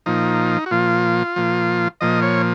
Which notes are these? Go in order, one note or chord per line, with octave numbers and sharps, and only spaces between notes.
A#2 F3 D#4
F#4
A#2 F3 F4
A#2 F3
A#2 F3 D#5
C#5